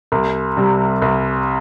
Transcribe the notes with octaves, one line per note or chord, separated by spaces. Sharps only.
C2
C3 G3
C2